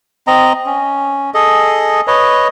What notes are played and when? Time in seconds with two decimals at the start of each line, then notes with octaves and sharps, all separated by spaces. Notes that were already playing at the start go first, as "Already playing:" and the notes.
0.27 C4 D#5 A#5
0.66 C#4
1.34 G#4 A4 D#5
2.07 B4 C#5 D#5